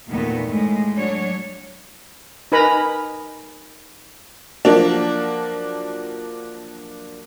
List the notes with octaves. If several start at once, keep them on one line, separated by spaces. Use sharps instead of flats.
E2 A#2 D#3 A3 B3
A2 G#3 A3
F#3 D4 C#5
D#4 A#4 B4 G#5 A#5 B5
F3 F#3 A#3 D4